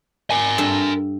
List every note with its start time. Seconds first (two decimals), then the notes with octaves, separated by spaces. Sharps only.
0.31 A#4 G#5
0.58 G2 A4 A5